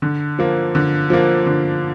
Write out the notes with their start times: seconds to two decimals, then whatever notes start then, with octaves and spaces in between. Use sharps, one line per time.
0.02 D3
0.39 F3 A#3
0.75 D3
1.10 F3 A#3
1.46 D3